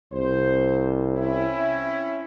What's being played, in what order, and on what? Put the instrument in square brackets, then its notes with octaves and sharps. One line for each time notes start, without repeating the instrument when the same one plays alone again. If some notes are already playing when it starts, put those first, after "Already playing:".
[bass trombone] C2 [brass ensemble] C5
[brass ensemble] C4 C#4 E4